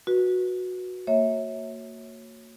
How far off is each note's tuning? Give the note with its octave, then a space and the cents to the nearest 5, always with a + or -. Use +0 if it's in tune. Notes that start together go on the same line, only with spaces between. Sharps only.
F#4 -10 B4 -20
A#3 -30 C#5 -10 E5 -25